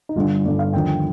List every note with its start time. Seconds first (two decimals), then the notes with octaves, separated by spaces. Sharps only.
0.09 D#4
0.16 G1 G2 D3 F4
0.45 G1 G2 D3 D5
0.59 F5
0.73 D#2 D3 F3 G5
0.88 G5